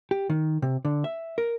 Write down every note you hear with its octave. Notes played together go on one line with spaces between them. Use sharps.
G4
D#3
C3
D3
E5
A#4